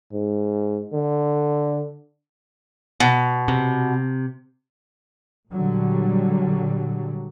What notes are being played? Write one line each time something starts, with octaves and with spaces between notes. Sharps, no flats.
G#2
D3
B2
C3
A#2 D3 F#3 G3